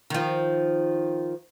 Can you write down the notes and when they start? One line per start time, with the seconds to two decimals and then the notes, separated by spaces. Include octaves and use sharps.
0.10 D#3 F3